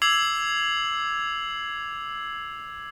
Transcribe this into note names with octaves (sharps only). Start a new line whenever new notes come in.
D6 E6 G#6 C7 F7 F#7